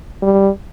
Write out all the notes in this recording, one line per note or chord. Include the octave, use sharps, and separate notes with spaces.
G3